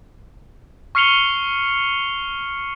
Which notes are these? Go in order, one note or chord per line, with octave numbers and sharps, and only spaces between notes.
C#6 F6 C7 C#7 F7 G7